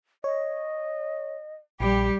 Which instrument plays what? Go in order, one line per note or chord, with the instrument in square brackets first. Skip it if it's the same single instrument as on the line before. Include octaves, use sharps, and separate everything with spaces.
[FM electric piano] C#5 [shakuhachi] D#5
[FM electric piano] A#1 [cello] G3 [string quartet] G4 [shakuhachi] B5